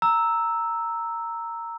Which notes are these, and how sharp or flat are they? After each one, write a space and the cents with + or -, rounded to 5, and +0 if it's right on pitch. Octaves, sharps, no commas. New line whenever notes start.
A#5 -10 E6 -5